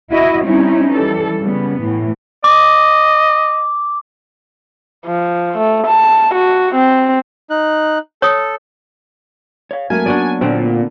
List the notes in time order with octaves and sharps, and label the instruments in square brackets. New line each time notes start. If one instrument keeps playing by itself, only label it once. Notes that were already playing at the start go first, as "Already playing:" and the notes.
[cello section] E4 F#4 D#5 E5
G3 C4 C#4 D#4 E4
E3 G3 A4
C#3 G3 B3
A2 E3
[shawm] D#5 [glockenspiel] D6
[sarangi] F3
A3
A5
F#4
C4
[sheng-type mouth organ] D#4 F#6
[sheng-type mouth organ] A4 [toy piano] C#5 D#6
[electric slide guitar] C#5 F5
[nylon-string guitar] F#3 A#3 C#4 [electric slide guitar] A3 [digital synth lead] G#5
[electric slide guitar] B3 [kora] D4 F#4 D5
[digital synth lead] A#2 [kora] D3 C4